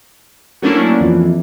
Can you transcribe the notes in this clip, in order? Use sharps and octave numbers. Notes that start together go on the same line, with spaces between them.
F#3 A3 A#3 C#4 D4 E4
F2 E3